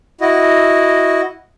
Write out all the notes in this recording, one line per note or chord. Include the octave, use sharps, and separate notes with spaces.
E4 F#4 D#5